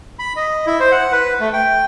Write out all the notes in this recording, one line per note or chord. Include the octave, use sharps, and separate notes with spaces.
B5
D#5
E4
C5
F#5
B4
A3
G5